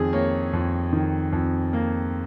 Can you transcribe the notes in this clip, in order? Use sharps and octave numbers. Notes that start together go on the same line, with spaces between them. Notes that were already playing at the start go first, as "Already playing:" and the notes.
Already playing: F2 D#3 G#4
A#3 C#5
F2
D#3
F2
A#3